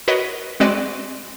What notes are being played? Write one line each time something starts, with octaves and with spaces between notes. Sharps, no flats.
F#4 A#4 B4 C#5 D#5
G#3 C4 F#4 B4 D5